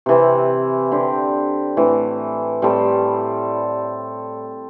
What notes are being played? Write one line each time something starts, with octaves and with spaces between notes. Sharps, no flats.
C3 E3 C4
D3 C4 G4
A2 E3 C4
A2 G3 C4 A4